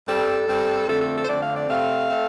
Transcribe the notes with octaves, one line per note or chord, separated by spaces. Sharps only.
G2 G3 C4 A4
G2 G3 C4
F2 D3 A3 C4 A4
A4
A4
C5
F2 D3 A3 C4 D5
F5
D5
C3 A3 C4 F5
A3 C4